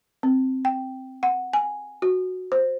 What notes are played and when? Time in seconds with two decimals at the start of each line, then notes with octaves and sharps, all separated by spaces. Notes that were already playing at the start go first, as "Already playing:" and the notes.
0.23 C4
0.65 G5
1.23 F#5
1.53 G#5
2.02 F#4
2.52 C5